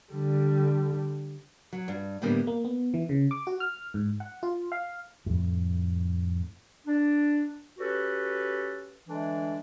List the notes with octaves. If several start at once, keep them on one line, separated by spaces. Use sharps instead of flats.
D3 G3
F#3
G2
A2 D3 G3 A#3 B3 D4
A#3
B3
E3
C#3
D6
F#4
F6
G#2
F#5
F4
F5
F2 A2
D4
C#4 F#4 G4 A4 B4
D3 E3 G#3 A3 D4